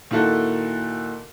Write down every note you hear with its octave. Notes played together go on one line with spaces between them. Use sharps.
A#2 D#3 E4 F#4 A4